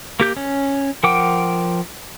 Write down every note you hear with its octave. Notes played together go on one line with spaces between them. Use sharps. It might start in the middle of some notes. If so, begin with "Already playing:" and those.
A#3 G4 G6
C#4
F3 A#4 F#5 G5 D6